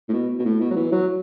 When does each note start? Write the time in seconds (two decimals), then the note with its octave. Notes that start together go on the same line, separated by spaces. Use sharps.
0.09 A2
0.13 B2
0.39 B2
0.45 A2
0.61 B2
0.71 F#3
0.76 E3
0.92 F#3